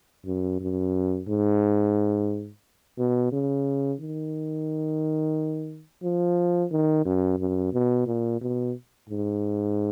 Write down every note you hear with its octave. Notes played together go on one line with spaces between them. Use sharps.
F#2
F#2
G#2
B2
C#3
D#3
F3
D#3
F#2
F#2
B2
A#2
B2
G#2